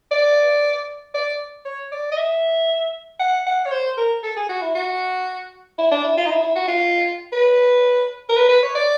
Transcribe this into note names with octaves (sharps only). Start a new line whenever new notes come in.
D5
D5
C#5
D5
D#5
E5
F#5
F#5
C#5
C5
A#4
A4
G#4
F#4
E4
F#4
E4
D4
E4
F4
D#4
E4
E4
F#4
F4
B4
A#4
B4
B4
C#5
D5